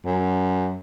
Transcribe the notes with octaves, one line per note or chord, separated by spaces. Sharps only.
F#2